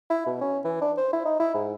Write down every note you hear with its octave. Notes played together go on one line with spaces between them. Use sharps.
E4
B2
C#4
E3
D4
C5
E4
D#4
E4
G#2